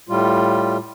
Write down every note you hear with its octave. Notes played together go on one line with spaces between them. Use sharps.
A2 G3 F4